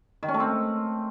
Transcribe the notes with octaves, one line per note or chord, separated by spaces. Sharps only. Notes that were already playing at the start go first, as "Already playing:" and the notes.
D#3
C#4
A3
C4